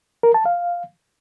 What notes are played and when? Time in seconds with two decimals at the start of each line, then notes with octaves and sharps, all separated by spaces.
0.23 A#4
0.34 A5
0.45 F5